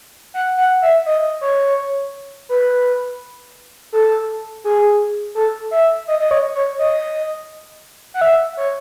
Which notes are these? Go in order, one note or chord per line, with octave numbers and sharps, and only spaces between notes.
F#5
F#5
E5
D#5
C#5
B4
A4
G#4
A4
E5
D#5
D#5
C#5
C#5
D#5
F#5
E5
C#5